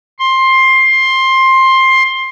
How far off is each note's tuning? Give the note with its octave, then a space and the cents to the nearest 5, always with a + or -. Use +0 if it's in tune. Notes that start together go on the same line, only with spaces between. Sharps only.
C6 +15